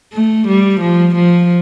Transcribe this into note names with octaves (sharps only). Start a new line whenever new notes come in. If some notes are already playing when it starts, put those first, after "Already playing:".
A3
G3
F3
F3